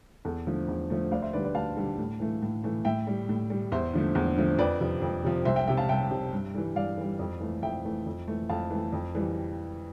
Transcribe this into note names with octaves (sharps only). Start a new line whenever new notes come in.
E2 A4
D3 F3 A3
E2
D3 F3 A3
D2 D5 F5
C5 E5
D3 G3 B4 D5
B4 D5
D2 F5 A5
D3 G3
A2
E3 A3
A2
E3 A3
A2 E5 G5
G3
A2
G3
E2 C5 E5
D3 F3 A3
E2
D3 F3 A3
F2 B4 D5
C3 F3
F2
C3 F3
C2 C5 E5
E5 G5
C3 G3 E5 G5
F5 A5
C2 E5 G5
C3 G3
G2
E3 G3
G2 D5 F5
E3 G3
F2
E3 A3
F2 E5 G5
E3 A3
F2
E3 A3
F2 F5 A5
E3 A3
F2
E3 G3